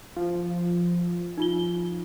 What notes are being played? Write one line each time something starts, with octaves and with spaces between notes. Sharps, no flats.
F3
D#4 F4 G7